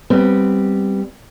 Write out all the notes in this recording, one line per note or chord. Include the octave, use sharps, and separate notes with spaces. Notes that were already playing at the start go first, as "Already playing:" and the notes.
G3 B3 C4